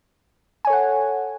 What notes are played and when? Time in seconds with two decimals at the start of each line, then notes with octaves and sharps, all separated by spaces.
0.65 G#5
0.67 C#5
0.70 A4
0.73 F#5